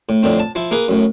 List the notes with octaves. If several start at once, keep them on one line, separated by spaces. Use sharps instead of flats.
A2
F2 A2 D3 C4
A5
F3 E4
A#3 G#4 B4
F#2 A2